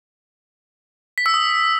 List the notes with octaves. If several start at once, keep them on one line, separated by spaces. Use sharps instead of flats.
B6
E6
D#6